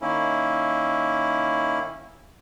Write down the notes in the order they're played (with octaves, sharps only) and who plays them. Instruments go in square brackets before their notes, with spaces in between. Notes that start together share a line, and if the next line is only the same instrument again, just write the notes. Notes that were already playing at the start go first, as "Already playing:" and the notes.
[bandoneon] D#3 A#3 C#4 E4